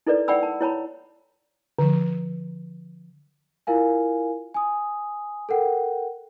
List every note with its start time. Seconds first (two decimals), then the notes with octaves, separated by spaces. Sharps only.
0.07 D#4 E4 A4 B4 D5
0.28 D5 F#5 G5 B5 E6
0.43 A5
0.61 E4 C#5 A5 B5
1.79 D3 F3
3.67 E4 F4 A#4 F5 G#5
4.54 G#5 D#6
5.49 A4 A#4 F#5 G5